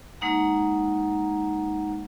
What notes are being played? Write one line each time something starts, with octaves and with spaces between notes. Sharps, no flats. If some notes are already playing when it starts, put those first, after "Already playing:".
G#3 A#3 D#4 F#5 A#5